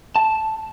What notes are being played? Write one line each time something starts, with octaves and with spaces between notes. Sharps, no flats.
A5